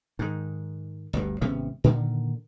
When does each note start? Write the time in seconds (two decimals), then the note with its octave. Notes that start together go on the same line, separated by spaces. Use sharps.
0.19 G#2 D#3
1.13 G1 D2 G2
1.41 G#1 C3 B3 C#4
1.84 A#2 D3 D#3